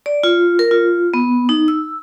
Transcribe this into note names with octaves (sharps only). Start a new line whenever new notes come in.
D5
F4
A#4
F4
B3
D#4
E6